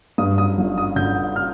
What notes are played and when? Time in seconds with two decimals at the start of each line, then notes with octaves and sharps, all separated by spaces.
0.18 G2 D#6
0.38 D#6
0.58 G1
0.78 D#6
0.96 D3 G6
1.36 F6